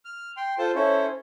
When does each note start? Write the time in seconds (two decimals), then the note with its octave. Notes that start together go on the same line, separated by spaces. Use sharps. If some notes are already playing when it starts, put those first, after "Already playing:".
0.05 F6
0.37 G5 C6
0.59 F4 A4 C5 A5
0.75 C#4 E4 A4 C5 C#5